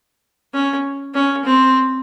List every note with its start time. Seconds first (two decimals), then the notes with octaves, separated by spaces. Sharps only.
0.53 C#4
1.14 C#4
1.45 C4